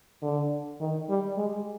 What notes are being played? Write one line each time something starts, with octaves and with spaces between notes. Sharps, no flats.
D3
D#3
G3
G#3